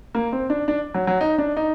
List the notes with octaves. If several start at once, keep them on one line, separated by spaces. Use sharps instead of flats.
A#3
C4
D4
D4
F#3
F#3
D#4
D4
D#4